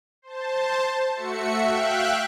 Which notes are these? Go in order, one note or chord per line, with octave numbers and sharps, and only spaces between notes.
C5 A5
A3 F#4 E5 C#7
E5 F5 G5 F#6